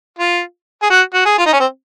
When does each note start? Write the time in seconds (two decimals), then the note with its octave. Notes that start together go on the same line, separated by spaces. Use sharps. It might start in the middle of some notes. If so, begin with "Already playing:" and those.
0.19 F4
0.82 G#4
0.90 F#4
1.14 F#4
1.25 G#4
1.39 F4
1.46 D#4
1.53 C#4
1.60 C4